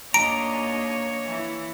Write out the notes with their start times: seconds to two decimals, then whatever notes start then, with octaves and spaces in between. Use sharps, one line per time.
0.14 D#2 A#3 D4 C#5 D#5 A#5 D7
1.25 E3 E4